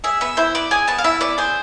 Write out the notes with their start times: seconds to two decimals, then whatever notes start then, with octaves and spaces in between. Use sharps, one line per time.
0.04 G#4 E5
0.21 B3 E5
0.37 E4 C5
0.55 B3 D5
0.71 G#4 G#5
0.88 B3 A5
0.98 F5
1.04 E4 E5
1.21 B3 D5
1.38 G#4 C5